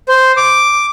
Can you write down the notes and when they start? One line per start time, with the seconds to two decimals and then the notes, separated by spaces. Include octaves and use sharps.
0.09 C5
0.37 D6